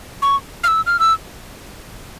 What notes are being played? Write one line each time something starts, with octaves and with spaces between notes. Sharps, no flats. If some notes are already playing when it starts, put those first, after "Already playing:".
C#6
F6
E6
F6
E6